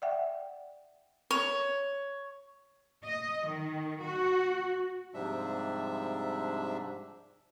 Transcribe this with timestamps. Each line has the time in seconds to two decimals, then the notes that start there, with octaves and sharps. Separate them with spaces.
0.02 D5 E5 F#5 G5
1.31 C#5
3.05 D#5
3.48 D#3
4.03 F#4
5.14 G#2 C3 F3 G3 D4 E5